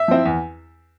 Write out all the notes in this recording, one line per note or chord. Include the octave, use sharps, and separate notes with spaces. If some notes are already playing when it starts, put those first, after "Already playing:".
Already playing: E5
F3 C4 E4
E2